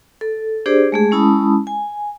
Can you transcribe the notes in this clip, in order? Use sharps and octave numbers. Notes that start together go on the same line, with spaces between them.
A4
D4 G4 G#4 C5 D5
G#3 A3 G#4
G#3 C#4 E4 A5 B5 D#6
G#5